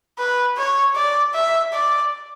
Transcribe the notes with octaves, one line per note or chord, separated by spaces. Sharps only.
B4
C#5
D5
E5
D5